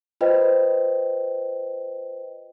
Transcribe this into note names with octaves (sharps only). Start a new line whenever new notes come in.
F4 B4 C5 D#5 G5